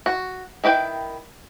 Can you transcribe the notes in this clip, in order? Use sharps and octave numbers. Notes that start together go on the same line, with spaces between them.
F#4
D#3 E4 B4 G5